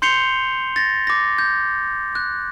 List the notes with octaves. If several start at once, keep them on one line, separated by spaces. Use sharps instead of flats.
C6 G6 C7 C#7 F7 G7
A6 A#6
D6 A#6
G6
F#6